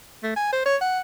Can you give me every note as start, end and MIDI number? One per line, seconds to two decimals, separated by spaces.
0.24 0.33 57
0.36 0.48 80
0.53 0.62 72
0.66 0.77 73
0.82 1.01 78